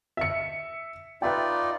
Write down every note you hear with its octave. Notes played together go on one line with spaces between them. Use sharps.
E5 C#7
D#4 F4 B4 D5 E5 G5